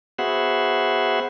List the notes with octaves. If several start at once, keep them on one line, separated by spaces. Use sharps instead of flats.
B3 F#4 G#4 C5 E5 F#5